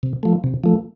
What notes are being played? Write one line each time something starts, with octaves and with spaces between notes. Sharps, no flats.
C3
F3 A3
C3
F3 A3